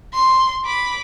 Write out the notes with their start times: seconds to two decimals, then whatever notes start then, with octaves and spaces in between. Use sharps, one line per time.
0.14 C6
0.66 B5 D6